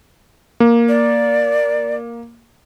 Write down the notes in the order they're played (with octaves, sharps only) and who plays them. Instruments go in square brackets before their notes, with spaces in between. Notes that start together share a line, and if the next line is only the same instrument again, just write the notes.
[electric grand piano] A#3
[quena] D5